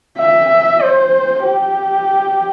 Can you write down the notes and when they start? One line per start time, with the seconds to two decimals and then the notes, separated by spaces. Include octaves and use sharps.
0.18 E5
0.82 C5
1.44 G4